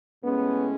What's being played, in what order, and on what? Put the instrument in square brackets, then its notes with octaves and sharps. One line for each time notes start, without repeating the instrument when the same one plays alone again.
[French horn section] A2 G#3 C#4 [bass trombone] B3